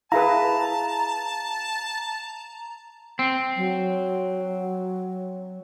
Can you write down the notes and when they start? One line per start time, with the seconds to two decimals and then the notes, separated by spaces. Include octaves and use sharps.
0.12 E4 G#4 B4 F5 A5 A#5
3.19 C4
3.56 F#3